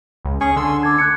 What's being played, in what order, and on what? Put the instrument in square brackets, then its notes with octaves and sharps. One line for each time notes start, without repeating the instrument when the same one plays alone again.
[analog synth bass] C#2
[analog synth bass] C#4 [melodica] G#4 C#6
[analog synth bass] D3 [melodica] C6 E6
[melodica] A4 [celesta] D6 G#6
[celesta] F#6 G#6 C#7